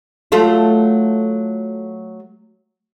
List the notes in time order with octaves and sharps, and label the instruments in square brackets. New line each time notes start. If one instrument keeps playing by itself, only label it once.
[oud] F#3 A3 F4